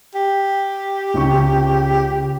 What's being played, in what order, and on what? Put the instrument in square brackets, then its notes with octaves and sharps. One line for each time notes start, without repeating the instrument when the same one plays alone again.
[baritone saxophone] G4
[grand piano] C#2 C#3 C#6